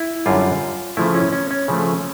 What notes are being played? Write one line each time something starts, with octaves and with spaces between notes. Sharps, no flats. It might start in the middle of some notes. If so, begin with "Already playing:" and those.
Already playing: E4
F#2 D3 G3 F4
C#3 F3 A3 E4
C#4
C#4
C#4
C#3 F3 A3